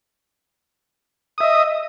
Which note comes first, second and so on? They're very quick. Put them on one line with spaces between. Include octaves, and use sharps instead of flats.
D#6 E5 D#5